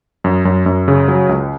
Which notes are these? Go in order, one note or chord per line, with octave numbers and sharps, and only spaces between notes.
F#2
F#2
F#2
C#3
F#3
C#2